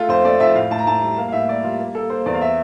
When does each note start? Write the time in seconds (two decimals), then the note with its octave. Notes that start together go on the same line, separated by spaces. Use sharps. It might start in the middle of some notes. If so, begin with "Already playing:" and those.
Already playing: A3 F4
0.09 F2 C5
0.25 A3 D5
0.40 F2 E5
0.55 A2 F5
0.71 A2 A5
0.79 A#5
0.86 A2 A5
1.02 G3
1.17 A#3 F5
1.28 F5
1.32 A2 E5
1.48 A#3 D5
1.64 G3 F4
1.79 A#3
1.95 A#3 A4
2.10 A#3 C5
2.26 E2 D5
2.34 F5
2.41 E5